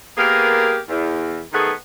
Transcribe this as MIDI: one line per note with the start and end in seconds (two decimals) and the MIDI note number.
0.18 0.79 58
0.18 0.79 59
0.18 0.79 67
0.18 0.79 68
0.18 0.79 70
0.88 1.42 40
1.52 1.71 51
1.52 1.71 57
1.52 1.71 59
1.52 1.71 68